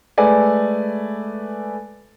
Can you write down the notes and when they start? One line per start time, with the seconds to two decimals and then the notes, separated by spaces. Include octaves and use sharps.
0.18 G#3 A3 A4 B4 D5 G#5